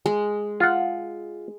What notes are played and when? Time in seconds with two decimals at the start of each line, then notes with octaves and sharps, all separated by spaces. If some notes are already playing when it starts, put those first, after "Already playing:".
0.06 G#3
0.60 F4 F#5